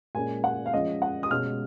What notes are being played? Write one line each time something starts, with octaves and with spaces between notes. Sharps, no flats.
A#2 G#3 C#4 G#5
F#5
F5
F3 G#3 C#4 D#5
F#5
D#6
B2 G#3 C#4 F6